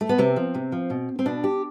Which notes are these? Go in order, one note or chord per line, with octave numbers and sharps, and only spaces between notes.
A3
B3
C3 C4
F3
C3
F3
B2
C4
B2 D4
G4